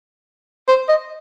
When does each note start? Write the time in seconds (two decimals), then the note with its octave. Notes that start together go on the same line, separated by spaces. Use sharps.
0.68 C5
0.89 D#5